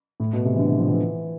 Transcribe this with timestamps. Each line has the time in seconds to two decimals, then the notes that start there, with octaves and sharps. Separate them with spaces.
0.20 A2
0.33 B2
0.45 C3
0.55 E3
0.59 D3
0.69 E3
0.79 F3
0.88 E3